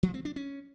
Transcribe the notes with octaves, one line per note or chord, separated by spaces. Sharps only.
F3
C4
D4
C#4